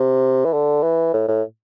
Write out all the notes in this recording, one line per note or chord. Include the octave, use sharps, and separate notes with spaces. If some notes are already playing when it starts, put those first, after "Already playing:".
Already playing: C3
E3
D3
E3
A2
A2